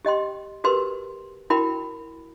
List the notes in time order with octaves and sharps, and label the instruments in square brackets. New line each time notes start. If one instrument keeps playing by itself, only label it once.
[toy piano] G4 D#5 G5 C6
F#4 G4 A#4 B4 C6 E6
E4 F#4 A#4 G5 B5